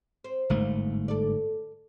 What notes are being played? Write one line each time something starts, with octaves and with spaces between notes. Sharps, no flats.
C4
G1 G#2 A3 A#3
A4 D5